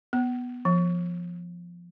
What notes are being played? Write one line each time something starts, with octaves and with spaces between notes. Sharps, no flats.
B3
F3